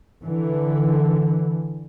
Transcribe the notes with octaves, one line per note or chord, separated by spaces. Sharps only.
D3 E3